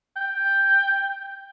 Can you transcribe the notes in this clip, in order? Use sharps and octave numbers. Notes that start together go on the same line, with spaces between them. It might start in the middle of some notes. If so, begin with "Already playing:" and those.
G5